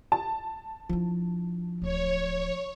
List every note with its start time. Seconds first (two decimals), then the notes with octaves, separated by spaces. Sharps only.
0.12 A5
0.89 F3 D4 E4
1.82 D1 A3 C#5